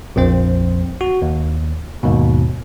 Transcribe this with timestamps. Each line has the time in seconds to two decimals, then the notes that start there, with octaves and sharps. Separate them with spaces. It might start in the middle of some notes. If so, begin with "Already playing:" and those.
0.16 A#1 F2 C4 C5
1.01 F#4
1.22 D#2
2.03 D#2 G#2 B2